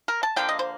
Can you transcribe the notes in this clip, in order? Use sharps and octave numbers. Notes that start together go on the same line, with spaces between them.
A#4
A5
D3 F3 A#3 G5
D#5
C5